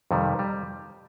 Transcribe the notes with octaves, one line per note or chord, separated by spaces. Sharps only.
F2 C3 D#3 G3
G3